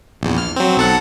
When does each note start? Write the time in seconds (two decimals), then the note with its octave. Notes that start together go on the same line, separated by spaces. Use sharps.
0.21 A#1 E2
0.38 F6
0.56 F#3 C4
0.77 B1 A4 F#5